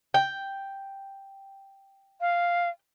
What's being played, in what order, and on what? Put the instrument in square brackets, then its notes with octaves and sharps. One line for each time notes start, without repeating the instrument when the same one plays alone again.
[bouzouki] G5
[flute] F5